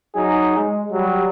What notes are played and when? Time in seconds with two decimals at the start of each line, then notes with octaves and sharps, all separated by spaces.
0.15 F#3 D#4 G#4
0.56 G#3
0.90 F#3 G3